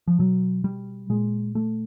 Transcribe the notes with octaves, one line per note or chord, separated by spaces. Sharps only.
F3
B2 F#3
G3
A#2 G#3
A3